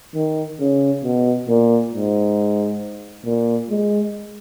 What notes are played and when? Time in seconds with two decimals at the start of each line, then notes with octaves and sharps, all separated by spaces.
0.15 D#3
0.60 C#3
1.03 B2
1.48 A#2
1.92 G#2
3.25 A#2
3.70 G#3